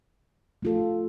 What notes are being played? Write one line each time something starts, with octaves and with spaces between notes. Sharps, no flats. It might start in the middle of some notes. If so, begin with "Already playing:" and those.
A3 F4 A4